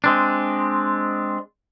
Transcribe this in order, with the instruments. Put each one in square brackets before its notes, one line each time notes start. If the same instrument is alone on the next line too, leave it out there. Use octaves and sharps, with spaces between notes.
[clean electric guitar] G#3 C4 D4